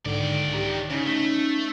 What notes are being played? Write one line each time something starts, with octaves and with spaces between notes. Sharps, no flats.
B1 G#2 D3 D#3 D5
G4 A#5
C#3 C#4 D#4
A3